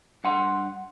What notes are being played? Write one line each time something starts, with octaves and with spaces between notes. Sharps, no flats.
G2 F#5 C6